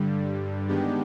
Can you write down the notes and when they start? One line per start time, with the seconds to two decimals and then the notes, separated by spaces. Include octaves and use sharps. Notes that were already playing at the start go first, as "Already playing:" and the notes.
Already playing: G2 D3 G3
0.68 D#3 G#3 B3 D4 G4